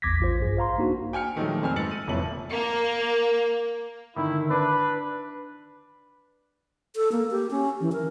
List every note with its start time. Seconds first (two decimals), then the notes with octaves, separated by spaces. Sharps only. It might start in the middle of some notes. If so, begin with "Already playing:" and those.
0.02 A1 E2 D6 G#6 A#6 B6
0.20 A1 F4 C5
0.39 A#1 G2 G#4
0.57 C5 F5 A#5 C6
0.78 A#3 D4 D#4 F#4
1.13 G5 G#5 F6 C#7
1.36 A#2 D#3 F3 F#3 G#3 A3
1.62 F2 C4 G#5 F6
1.76 G#2 B4 E6 A6 C#7 F#7
1.91 D#7
2.07 F1 F2 A#2 E4 C#5 F#7
2.52 A#3
4.16 D3 D#3 E4
4.51 D4 B4
6.96 A4
7.12 A#3
7.31 G4
7.51 C#4
7.81 E3
7.92 A#4